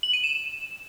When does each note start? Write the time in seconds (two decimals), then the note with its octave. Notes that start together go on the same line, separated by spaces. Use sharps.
0.03 F#7
0.13 D#7
0.24 E7